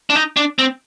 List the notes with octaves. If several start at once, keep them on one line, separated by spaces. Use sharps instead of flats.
D4
D#4
D4
C4